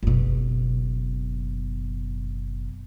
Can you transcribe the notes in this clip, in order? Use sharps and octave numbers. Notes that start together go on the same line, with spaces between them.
F#1 B2